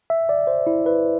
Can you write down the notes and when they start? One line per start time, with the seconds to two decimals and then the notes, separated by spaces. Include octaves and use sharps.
0.10 E5
0.29 D5
0.47 C5
0.67 E4
0.86 B4